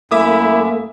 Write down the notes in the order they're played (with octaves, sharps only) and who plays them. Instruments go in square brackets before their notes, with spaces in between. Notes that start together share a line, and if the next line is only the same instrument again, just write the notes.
[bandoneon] F#2 [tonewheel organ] A3 A#3 [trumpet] E4 [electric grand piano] E5 D6 D#6